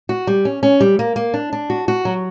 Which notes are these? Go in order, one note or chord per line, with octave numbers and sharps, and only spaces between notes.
F#4
G3
C#4
C#4
G3
A#3
A#3
D4
D4
F#4
F#4
F#3